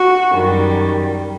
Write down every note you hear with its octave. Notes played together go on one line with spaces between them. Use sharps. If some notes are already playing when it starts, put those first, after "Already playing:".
Already playing: F#4
F#2 D#3 G3